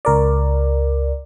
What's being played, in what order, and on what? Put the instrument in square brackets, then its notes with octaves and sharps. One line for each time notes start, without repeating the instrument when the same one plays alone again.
[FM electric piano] C#2 A#4 D5